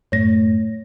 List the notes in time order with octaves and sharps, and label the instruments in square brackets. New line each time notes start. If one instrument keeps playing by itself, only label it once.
[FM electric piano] F#2 A2 A3 [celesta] C#5 A#6